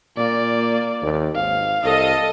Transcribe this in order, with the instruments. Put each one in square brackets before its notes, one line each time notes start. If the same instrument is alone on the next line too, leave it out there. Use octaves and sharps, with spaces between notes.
[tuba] A#2 [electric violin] A#3 D5
[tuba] D#2
[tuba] G#1 [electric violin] F5
[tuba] C2 [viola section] A4 D#5